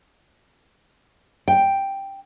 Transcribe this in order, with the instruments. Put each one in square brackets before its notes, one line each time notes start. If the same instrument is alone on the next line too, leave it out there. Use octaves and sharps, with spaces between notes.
[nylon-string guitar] G5